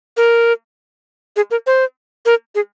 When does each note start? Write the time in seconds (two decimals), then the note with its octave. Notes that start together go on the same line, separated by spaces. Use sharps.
0.17 A#4
1.36 G#4
1.51 A#4
1.67 C5
2.26 A#4
2.55 G#4